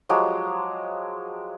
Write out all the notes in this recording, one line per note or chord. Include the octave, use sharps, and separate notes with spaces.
F3 F#3 G#3 G4